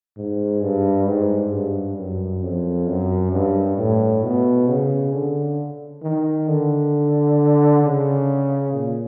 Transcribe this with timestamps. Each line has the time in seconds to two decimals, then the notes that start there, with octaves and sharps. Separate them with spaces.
0.17 G#2
0.62 G2
1.07 G#2
1.53 G2
1.97 F#2
2.43 F2
2.88 F#2
3.33 G2
3.78 A2
4.23 B2
4.68 C#3
5.12 D3
6.03 D#3
6.48 D3
7.83 C#3
8.73 A#2